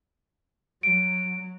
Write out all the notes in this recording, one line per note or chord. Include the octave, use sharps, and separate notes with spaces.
F#3 D7